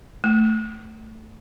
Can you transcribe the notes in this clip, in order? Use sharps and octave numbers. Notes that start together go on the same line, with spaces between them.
A3